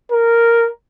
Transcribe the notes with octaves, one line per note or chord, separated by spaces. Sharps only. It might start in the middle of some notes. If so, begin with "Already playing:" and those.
A#4